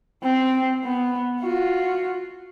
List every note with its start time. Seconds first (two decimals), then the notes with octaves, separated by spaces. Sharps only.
0.23 C4
0.84 B3
1.40 F4 F#4